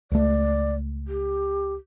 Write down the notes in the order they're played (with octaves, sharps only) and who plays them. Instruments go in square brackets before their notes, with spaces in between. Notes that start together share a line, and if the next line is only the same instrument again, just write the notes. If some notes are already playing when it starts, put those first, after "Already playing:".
[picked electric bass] C#2 A3 [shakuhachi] D5
[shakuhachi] G4